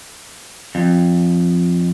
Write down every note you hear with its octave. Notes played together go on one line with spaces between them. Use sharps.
F2